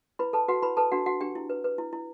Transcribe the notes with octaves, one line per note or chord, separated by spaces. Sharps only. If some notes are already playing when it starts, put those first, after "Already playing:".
E4 B4 B5
A4 B4 A5
F#4 B4 F#5
E4 B4 B5
A4 B4 A5
D4 F#4 F#5
F#4 F#5
D4 G4 G5
E4
B4
B4
E4
E4